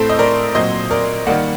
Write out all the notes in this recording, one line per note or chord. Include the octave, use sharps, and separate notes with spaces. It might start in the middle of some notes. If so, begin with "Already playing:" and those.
Already playing: A2 A3 C4 A4 C5
D#5
A#4 D5
A#2 F#3 C4 C5 D#5
A#4 D5
D#3 G3 A#3 D5 F#5